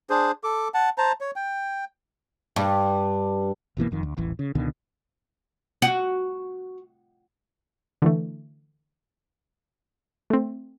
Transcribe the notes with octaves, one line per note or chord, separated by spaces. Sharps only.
D4 G#4 C5
A4 D6
F#5 A5
C5 A5 A#5
C#5
G5
G2
G1 B2 E3 A#3
E1 F2 D#3
D2
D#1 A1 E3
C#3
C#2 B2 D3 D#3
F#4
D3 E3 A3
A3 C4